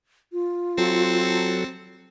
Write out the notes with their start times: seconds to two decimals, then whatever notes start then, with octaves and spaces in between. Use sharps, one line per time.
0.33 F4
0.78 F#3 C4 A4